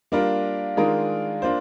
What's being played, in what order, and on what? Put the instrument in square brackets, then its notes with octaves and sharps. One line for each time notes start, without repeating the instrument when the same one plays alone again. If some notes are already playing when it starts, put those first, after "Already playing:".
[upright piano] G3 A#3 D4 F4 A#4
D#3 G#3 D4 F4 A#4
A#3 D4 F4 C5